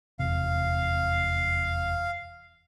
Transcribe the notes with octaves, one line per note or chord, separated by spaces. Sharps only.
F1 E2 C3 F5